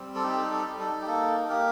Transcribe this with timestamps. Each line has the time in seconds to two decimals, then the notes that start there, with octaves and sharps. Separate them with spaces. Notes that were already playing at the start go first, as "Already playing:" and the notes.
Already playing: G3 C4
0.15 A4
0.23 D#4 G4
0.51 A4
0.65 D#4
0.79 A4
1.01 G4
1.07 A#3 A4
1.49 A#3 G4 A#4